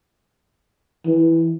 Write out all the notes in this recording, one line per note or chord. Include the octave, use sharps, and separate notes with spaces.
E3